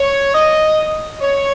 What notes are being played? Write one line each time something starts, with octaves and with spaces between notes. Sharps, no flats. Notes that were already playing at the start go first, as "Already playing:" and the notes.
Already playing: C#5
D#5
C#5